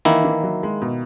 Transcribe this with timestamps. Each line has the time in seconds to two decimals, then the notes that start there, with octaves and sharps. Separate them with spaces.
0.05 D#3 E3 A#3 E4
0.25 E3
0.43 F#3
0.63 G#3
0.82 B2